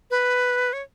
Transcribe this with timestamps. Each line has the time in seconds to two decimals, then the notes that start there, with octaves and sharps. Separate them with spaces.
0.11 B4
0.73 C#5